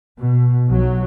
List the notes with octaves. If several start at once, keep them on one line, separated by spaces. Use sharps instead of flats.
B2
B1 F#3